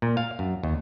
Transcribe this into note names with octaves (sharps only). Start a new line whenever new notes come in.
A#2
F5
F#2
D#2